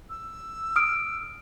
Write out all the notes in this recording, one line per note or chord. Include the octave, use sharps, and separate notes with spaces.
E6
D#6 F6 D7